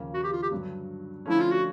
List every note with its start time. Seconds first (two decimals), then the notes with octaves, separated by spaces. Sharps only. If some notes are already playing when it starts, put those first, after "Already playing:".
Already playing: D#2 C#3 F3 A#3 C#4
0.14 F#4
0.24 G4
0.33 F4
0.43 G4
0.51 G2 D3 F#3
1.26 D3 F3 A3 C#4 E4
1.40 F4
1.52 F#4